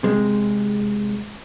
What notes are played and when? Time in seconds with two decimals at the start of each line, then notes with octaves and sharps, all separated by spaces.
0.03 C3 G#3